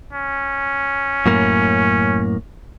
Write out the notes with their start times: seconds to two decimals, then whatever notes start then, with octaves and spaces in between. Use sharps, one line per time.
0.13 C#4
1.26 F#2 A2 A#3